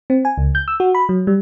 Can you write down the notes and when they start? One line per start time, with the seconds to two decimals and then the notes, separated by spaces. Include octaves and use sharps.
0.10 C4
0.25 G#5
0.38 C#2
0.55 G6
0.68 E6
0.80 F#4
0.95 B5
1.09 F#3
1.27 G3